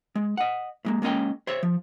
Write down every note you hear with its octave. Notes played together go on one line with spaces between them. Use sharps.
G#3
D#5 F#5
A2 G#3 A#3
G#3 A#3 C#4 D#5 G5
C5 C#5 E5
F3